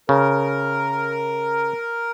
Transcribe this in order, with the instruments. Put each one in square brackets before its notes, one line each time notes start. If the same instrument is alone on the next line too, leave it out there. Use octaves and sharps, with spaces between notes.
[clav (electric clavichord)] C#3 [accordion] A#4